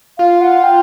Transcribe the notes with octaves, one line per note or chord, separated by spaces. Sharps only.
F4 F5
F#5
G5